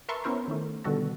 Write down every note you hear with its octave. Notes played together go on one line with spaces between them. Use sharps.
A#4 B4 E5 A5 C6 C#6
B3 C#4 E4 A#4 C5
D#3 A3
B2 D3 D#3 G3 F#4 A4